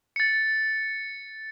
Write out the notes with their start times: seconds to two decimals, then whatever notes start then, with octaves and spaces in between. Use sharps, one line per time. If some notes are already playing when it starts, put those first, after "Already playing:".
0.16 A6 C#7